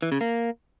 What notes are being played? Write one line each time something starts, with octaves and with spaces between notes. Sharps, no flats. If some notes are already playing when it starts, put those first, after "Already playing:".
E3
C#3
A#3